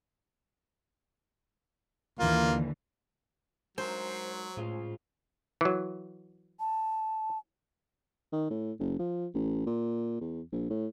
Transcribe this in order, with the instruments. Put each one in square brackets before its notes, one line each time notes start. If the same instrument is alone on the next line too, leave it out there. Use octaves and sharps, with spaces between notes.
[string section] D#2 D3 E3 [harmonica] A#3 F4
[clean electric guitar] G#2 A#4 [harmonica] F#3 [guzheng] C5
[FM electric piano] A2 [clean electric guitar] C#3 G#3 F4
[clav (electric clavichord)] E3 F#3
[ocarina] A5
[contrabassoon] D#3
A2
F#1
F3
A1
A#2
E2
A#1
A2